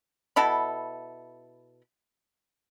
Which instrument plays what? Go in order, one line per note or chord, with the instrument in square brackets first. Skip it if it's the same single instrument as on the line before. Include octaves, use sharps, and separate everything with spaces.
[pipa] B2 E4 A4 B5